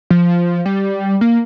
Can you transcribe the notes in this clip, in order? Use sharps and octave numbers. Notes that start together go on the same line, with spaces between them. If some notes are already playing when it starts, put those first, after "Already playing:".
F3
G3
A#3